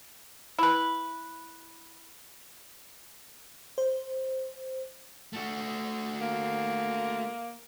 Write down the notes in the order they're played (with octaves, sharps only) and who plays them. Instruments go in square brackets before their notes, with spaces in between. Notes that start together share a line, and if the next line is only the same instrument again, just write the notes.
[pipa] E4 B4
[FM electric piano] C5
[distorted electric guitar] A3 F#4
[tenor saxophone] A#3